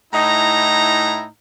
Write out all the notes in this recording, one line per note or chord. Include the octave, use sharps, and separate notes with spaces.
A2 D#4 E4 A#5